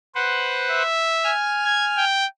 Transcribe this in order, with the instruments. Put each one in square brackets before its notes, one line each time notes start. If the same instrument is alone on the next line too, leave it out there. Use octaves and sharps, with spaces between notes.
[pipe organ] B4 C5 F#5
[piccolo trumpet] E5
[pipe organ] G#5 F6
[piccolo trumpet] G#6
G5